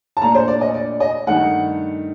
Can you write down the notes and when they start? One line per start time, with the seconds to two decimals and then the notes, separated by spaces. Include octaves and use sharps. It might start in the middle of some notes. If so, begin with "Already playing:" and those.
0.17 A5
0.21 A#1 A#2 A3 D4 A#5
0.35 C5
0.48 D5
0.61 D#5
0.74 D5
1.00 D#5
1.27 G2 D#3 A3 F#5